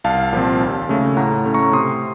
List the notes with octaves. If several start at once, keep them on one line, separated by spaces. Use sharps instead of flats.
C2 F5 A5
A#2 F3 C4
D#2
C#3 A3
A2 F#5 A#5
A3 C#4
A#5 C#6
C3 C6 D#6